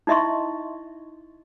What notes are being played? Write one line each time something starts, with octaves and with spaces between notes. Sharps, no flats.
D#4 E4 D#5 E5 C6 C#6